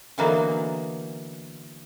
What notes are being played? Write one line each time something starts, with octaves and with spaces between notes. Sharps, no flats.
D3 E3 F#3 A#3 B3 D#4